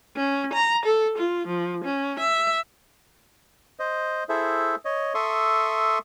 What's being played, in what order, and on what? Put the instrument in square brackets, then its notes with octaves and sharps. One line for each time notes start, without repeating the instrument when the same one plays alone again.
[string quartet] C#4
A#5
A4
F4
F3
C#4
E5
[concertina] C5 D#5
E4 G#4 A4 C5 E5
C#5 D#5
A4 E5 C6 C#6 D#6